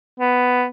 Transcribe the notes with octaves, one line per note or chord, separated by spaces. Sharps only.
B3